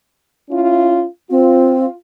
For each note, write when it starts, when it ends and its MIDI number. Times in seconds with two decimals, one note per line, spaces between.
0.50 1.05 61
0.50 1.05 64
0.50 1.05 65
1.30 1.85 60
1.30 1.92 65